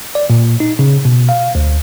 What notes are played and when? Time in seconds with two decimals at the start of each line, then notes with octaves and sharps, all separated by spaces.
0.15 D5
0.30 A#2
0.60 D#4
0.79 C#3
1.05 B2
1.29 F5
1.55 D2